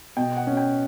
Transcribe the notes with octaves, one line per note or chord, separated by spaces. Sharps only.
B2 G5
F#5
C#4
G5